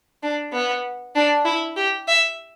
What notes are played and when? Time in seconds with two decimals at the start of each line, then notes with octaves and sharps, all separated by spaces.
0.23 D4
0.53 B3
1.16 D4
1.45 E4
1.76 G4
2.08 E5